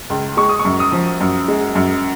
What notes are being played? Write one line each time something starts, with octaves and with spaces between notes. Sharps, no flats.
C#2
G#3 C#6
D#6
C#6
F#2
D#6
F3
F#2
G#3
F#2